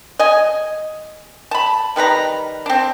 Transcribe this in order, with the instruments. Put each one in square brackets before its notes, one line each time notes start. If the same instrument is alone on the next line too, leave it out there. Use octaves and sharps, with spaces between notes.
[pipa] D#5 G#5
A5 B5
D#3 G3 B4 A#5
C4 D4